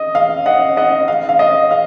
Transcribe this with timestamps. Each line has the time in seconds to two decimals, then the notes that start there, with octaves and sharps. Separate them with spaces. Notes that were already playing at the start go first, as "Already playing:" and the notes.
Already playing: D#5
0.15 F5
0.46 D#5 F#5
0.77 D#5 F#5
1.08 F5
1.29 F5
1.39 D#5
1.71 F5